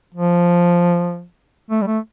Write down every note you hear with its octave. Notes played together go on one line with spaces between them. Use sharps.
F3
A3
G3
A3